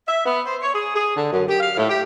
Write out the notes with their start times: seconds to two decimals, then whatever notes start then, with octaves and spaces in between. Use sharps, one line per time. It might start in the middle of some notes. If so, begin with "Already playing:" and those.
0.08 E5
0.26 B3
0.46 C5
0.62 C#5
0.74 G#4
0.96 G#4
1.16 D3
1.32 F#2
1.49 G4
1.60 F5
1.77 A2
1.89 G4